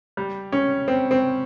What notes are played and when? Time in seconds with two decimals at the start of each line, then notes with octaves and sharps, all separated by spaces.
0.17 G3
0.52 C#4
0.88 C4
1.11 C4